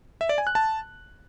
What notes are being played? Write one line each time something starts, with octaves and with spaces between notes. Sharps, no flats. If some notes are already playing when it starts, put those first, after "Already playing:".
E5
D5
G#5
F#6
A5